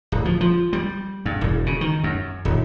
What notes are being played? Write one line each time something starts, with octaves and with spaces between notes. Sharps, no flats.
D1
F3
F3
G3
G2
E1
C#3
D#3
F#2
D#1